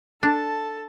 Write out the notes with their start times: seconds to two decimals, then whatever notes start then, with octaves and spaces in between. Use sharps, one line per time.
0.23 D4 A4 A5